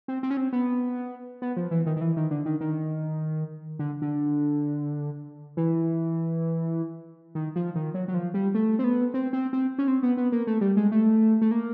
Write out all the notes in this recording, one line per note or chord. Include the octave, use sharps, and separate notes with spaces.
C4
C4
C#4
C4
B3
B3
F3
E3
D#3
D#3
E3
D#3
D3
D#3
D#3
D3
D3
E3
D#3
F3
D#3
F#3
F#3
F3
G3
A3
C4
B3
C4
C4
C4
C#4
C4
B3
B3
A#3
A3
G3
G#3
A3
A3
A#3